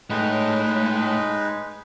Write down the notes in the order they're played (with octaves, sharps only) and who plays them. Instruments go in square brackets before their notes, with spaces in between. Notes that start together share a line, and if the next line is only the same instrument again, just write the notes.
[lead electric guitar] A2 [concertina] G#3 D#4 B4